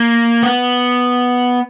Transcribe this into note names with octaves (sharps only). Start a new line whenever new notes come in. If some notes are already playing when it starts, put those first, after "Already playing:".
Already playing: A#3
B3